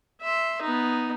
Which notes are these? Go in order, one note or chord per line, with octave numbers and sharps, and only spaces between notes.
E5 C6
B3 D#4